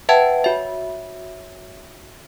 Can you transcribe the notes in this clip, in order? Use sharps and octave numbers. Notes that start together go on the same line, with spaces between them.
B4 E5 F#5 G5 A5 G#6
F#4 C#5 E5